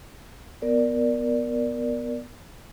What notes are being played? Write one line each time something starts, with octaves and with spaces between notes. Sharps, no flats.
B3 A#4 D5